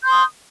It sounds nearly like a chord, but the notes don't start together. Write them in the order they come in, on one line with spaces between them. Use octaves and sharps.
G6 C6 D#6